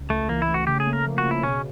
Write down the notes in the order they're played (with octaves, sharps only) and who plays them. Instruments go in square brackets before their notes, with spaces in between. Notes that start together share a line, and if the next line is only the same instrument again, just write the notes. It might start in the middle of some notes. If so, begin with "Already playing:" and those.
Already playing: [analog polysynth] C#2
[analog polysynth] C#2 [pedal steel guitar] A3
[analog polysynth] E3 [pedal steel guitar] A#3
[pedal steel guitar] E4
[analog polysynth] A3
[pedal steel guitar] F#4
[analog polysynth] C#3 [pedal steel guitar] G4
[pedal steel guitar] G#4
[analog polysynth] A#3
[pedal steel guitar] A#4
[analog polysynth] F3
[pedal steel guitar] F#4
[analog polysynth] C#3
[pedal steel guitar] E4
[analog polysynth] B2 [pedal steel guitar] C#4